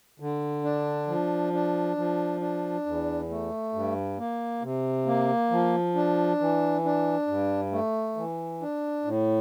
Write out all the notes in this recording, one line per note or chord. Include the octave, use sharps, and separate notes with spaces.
D3
D4
F3
D4
F3
D4
E2
A3
G2
A#3
C3
A#3
F3
D4
E3
D4
G2
A3
E3
D4
A2